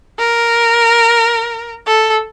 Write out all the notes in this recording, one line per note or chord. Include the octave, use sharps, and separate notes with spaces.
A#4
A4